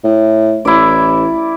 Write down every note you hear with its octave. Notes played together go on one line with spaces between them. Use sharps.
A2
A1 E4 D5